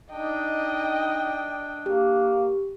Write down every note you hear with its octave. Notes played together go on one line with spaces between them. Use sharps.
D4 D#4 D#5 G5
A#3 G4